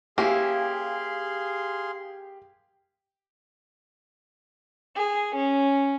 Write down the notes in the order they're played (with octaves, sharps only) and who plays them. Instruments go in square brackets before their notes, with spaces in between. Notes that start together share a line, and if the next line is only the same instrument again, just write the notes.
[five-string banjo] A#3 C#4 E4 [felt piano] G4 [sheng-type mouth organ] G#4 F5 C6
[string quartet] G#4
C#4